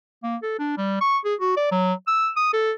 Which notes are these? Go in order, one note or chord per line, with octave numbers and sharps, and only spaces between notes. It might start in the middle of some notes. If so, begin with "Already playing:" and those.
A#3
A4
D4
G3
C#6
G#4
F#4
D5
F#3
E6
D#6
A4